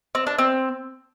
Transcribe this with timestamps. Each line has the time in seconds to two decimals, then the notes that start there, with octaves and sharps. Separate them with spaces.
0.15 C4
0.27 D4
0.38 C4